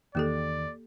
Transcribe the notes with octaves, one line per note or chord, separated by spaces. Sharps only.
E2 D#3 A#3 G4 A4 D5